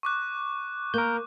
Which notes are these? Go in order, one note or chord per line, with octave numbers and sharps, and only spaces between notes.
C#6 D6 F#6
A#3 A#4 G6